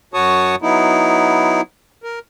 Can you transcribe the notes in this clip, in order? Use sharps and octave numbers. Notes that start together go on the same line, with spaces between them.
F#2 F#4 C#5 A5 C#6 D#6
F#3 B3 D#4 E4
A#4